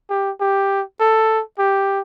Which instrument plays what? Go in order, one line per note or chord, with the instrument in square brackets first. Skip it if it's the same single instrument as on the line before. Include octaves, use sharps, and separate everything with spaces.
[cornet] G4
G4
A4
G4